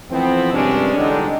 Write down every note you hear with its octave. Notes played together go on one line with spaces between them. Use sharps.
E3 F3 A3 B3 C4
G2 C3 D#3 G#3 C#4 D4
D3 E3 G3 G#3 D4 D#4